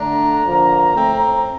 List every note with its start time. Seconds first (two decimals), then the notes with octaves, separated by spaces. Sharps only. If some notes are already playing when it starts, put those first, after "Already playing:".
Already playing: D3 A3 D4 A#5
0.43 D3 F3 A#3
0.96 A2 A3 C4